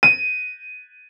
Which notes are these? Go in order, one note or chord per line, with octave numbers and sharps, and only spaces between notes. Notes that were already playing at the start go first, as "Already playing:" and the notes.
D#7